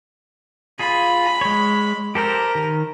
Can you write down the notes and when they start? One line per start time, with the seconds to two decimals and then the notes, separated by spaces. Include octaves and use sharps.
0.79 F4 G#4 B5
1.41 G#3 C#5
2.15 G4 A4 A#4 C5
2.55 D#3